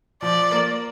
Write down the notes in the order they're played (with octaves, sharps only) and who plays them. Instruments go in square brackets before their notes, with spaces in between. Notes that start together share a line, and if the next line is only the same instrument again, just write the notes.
[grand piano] F3 [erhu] D5
[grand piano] A#3